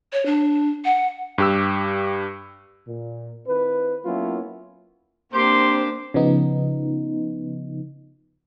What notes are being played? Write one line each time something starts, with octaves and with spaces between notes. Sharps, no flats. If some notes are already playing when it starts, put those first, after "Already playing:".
C#5
D4
F#5
G2 G4 E6
A#2
D#3 C4 E4 B4
F#3 A#3 B3 C#4 E4 F4
A#3 C4 D4 G4 A#4 C5 C6
C#3 F3 B3 D#4